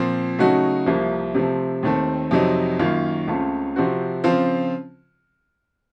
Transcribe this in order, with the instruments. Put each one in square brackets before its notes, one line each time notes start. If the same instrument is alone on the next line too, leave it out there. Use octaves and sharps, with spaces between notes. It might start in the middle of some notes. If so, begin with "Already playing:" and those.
Already playing: [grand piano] A#2 F3 C4
C#3 F#3 A3 D#4 F#4
C2 C3 F3 A#3
C3 F3 A3 C4
D#2 D#3 A3 C4
F2 C3 F#3 C4 D#4
F#2 D#3 A#3 C#4 F4
C#2 C#3 A3 C4 F4
C3 F3 C4 F#4
C#3 F3 C4 F4